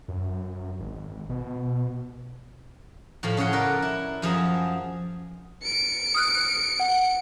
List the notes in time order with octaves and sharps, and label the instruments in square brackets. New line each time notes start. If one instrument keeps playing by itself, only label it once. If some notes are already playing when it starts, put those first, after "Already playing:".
[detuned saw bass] F#2
G#1
B2
[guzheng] A2 F3 A4 F5 B5
C#3 C#4 C#5 F#5 C6
A#4 B4 D5
E4
F#2 F3 G#4 A5 A#5
[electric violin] C#7 D7
[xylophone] D#6 F6 F#6
F#5